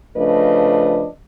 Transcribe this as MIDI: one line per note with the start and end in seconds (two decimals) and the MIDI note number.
0.17 1.07 49
0.17 1.07 53
0.17 1.07 57
0.17 1.07 62
0.17 1.07 71
0.17 1.07 75